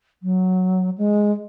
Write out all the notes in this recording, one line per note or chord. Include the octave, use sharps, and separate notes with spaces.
F#3
G#3